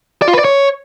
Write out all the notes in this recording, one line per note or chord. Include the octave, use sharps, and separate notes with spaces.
D5
F4
B4
D5
C#5